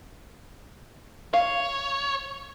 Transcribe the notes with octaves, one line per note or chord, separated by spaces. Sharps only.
C#5 F5